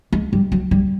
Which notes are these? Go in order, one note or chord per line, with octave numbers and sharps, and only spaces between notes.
G#3
G3
F#3
G3